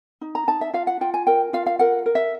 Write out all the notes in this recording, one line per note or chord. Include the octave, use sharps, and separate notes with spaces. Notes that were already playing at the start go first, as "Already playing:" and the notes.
D#4
A#5
D#4 A5
E5
F4 F5
F#5
F4 G5
G#5
A#4 G5
F4 F5
F5
A#4 F#5
A#4
E5